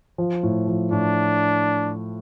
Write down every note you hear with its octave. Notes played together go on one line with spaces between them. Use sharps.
F3
A2
F3
A2 D4